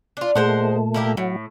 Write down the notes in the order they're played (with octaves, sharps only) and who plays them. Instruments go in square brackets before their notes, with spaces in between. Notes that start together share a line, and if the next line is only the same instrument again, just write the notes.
[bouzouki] D4 F4
[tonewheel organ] A#2 A3 [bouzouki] G#3 C5 F#5
[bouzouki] A#3 E4 G4
[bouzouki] A2 [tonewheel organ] F#3